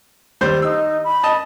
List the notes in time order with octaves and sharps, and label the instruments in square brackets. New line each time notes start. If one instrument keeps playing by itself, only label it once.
[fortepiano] D#2 G3 C5
[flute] D#4 [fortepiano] E6
[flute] B5
[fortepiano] D#5 A5